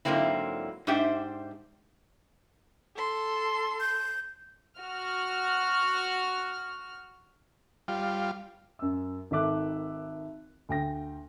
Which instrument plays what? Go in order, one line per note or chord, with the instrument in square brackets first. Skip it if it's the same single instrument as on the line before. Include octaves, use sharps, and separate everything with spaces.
[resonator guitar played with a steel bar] G#2 D3 F#3 A#3 C4 E4
G#2 D4 G4 C5 E5 G5
[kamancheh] A4 C6
[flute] G6
[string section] F#4 F6
[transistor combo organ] G3 F4
[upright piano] F#2 E6
G#1 D#3 A4 E5 D6 F#6
D2 G5 A#6